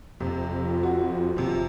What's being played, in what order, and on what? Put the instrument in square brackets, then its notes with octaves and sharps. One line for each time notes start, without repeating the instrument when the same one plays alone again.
[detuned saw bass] F2 [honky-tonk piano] C3
[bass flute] F4
[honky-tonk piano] F#4
[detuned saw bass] G1 [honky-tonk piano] C3 F3